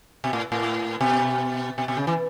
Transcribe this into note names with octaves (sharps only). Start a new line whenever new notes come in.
B2
A2
A2
B2
B2
B2
C#3
E3